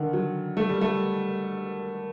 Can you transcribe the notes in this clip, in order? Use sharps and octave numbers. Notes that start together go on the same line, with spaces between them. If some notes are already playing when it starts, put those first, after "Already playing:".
Already playing: D3 D#3
F#3
A3
G3
A3